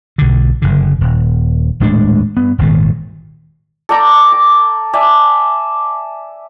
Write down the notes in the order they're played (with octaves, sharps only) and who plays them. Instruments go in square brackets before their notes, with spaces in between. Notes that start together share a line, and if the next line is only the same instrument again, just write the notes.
[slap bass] B1 D3
F#1 D3
D#1
D#1 A2 G#3 D4
G2 B3
D#1 G#1 A#2 D#3
[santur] A4 D5 G5 A#5
D6
D5 E5 G#5 A5